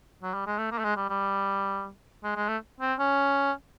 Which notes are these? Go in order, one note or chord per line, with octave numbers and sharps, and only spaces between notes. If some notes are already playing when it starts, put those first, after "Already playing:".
F#3
G3
G#3
A3
A#3
A3
G#3
G3
G3
G#3
G#3
A3
C4
C#4